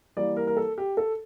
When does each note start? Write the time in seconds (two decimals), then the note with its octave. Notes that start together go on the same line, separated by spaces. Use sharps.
0.17 E3 G3 A#3 D5
0.37 A#4
0.47 A#4
0.57 A4
0.78 G4
0.97 A4